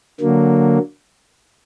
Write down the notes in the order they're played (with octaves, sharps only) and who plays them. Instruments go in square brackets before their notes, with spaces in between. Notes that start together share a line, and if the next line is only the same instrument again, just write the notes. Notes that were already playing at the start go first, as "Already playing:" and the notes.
[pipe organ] D3 F#3 A#3